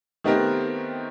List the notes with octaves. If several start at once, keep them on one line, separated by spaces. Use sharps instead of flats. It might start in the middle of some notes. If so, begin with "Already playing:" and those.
D#3 A3 B3 C4 G4 A#4